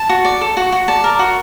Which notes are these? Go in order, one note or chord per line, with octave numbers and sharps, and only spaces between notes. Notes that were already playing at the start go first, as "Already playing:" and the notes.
Already playing: A5
F#4
D5
A4
F#4
F#4
D5 A5
A#4
F#4